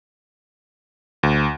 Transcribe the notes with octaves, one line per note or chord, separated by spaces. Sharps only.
D2